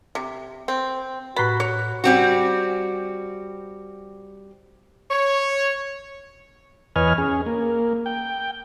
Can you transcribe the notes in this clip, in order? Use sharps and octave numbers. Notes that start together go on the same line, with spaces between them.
C3
C4
A2 F#4 B4 B5
C#5
G3 C4 F#4
C#5
E2 B4 C#5 D#5 G#5 F6
C#4 G#4
A#3
G5